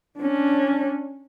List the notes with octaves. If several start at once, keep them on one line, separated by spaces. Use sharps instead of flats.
C#4 D4